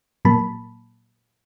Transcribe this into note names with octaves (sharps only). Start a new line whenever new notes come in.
A#2 F#3 A#3 A5 B5